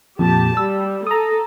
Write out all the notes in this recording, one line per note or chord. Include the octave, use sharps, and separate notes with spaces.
F2 A#2 G4 A5
G3 E6
A4 A#5 D#6